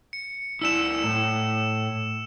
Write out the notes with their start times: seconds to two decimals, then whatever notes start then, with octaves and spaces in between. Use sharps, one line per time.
0.13 C#7
0.62 E4 D5 E6 E7
1.04 A2